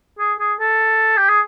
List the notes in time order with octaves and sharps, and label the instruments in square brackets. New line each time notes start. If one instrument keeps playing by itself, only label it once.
[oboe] G#4
G#4
A4
G4
G#4